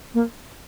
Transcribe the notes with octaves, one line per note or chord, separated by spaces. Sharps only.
A#3